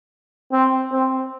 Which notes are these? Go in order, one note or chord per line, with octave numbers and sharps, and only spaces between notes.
C4
C4